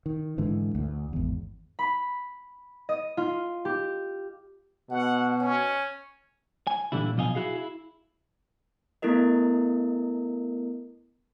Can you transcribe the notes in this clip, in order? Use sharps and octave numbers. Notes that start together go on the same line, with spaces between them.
D#3
G#2 D3 E3
D2
G#1 E2
B5
D#5
F4
G4
B2 F#5
C#4
G#5
A#2 D3 E3 G3 E4
B1 B2 F3 D#5 F5 G#5
E4 F#4 G#4 F5
E4
A3 B3 E4 A4 A#4 D#5